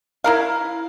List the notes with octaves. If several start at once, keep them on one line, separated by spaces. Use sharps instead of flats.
E4 A#4 F5